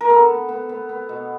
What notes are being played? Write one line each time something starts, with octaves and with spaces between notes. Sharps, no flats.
A#4
B3 A4
B3
B3
B3
B3
B2